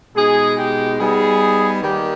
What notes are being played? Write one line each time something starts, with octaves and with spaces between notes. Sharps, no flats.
B2 G#3 D#4 G#4
G4
G3 B3 D#4 G#4
D#3 G3 A#3 G4